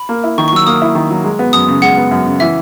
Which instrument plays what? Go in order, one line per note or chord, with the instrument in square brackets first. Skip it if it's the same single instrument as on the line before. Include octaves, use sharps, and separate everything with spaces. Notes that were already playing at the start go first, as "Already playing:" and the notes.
Already playing: [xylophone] B5
[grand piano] A#3
E4
[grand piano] D#3 [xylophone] C#6
[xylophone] C#6
[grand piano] F#3 [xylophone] E6
[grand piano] A#3 [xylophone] D#6
[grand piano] E4
D#3
F#3
G#3
B3
[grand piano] F#2 [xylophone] D#6
[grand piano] C#3
[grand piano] G#3 [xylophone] F#5
[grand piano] B3
F#2
C#3
[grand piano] E3 [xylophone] E5